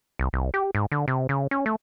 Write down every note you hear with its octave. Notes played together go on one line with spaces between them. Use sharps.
C2
C2
G4
G#2
D3
C3
C#3
C#4
A3